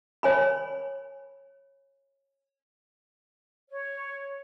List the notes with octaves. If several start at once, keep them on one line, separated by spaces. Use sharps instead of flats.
C#5 G#5 B5
C#5